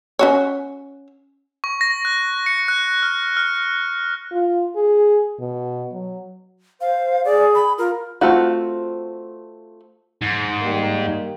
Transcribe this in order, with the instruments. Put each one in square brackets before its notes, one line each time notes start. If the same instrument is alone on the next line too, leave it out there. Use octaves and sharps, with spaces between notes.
[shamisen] C#4 F#4 C#5
[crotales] C#6
A#6
F#6
C#7
F#6
F6
F6
[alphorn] F4
G#4
B2
F#3
[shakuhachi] C5 [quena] F5
[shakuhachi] G#4 [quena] D5
[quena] B5
[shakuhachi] F4 [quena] A#4
[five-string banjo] A3 C4 F4 F#4
[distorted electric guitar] G#2
[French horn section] D#3 G3 A#3